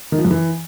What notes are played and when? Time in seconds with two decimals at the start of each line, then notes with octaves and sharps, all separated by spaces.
0.12 D#3
0.18 F3
0.24 F#2
0.31 E3